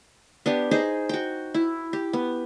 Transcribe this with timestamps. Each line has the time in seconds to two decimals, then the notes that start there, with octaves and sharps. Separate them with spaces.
0.46 B3 D4 G4
0.71 D#4 G#4 C5
1.09 F#4 G5
1.54 E4
1.93 G4
2.13 B3